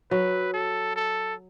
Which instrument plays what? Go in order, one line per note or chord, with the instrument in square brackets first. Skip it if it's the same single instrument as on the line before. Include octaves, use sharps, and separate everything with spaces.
[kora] F#3 [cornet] B4
[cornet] A4
A4